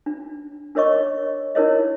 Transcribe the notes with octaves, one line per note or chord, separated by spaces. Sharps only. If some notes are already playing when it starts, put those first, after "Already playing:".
D4
D4 A#4 C#5 D#5 C#6
D4 E4 A#4 C#5 D#5